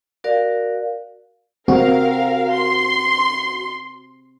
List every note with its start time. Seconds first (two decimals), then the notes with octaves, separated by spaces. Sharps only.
0.24 F#4 A#4 D5 F5
1.68 C4 F#4 A#4 F5
2.54 C6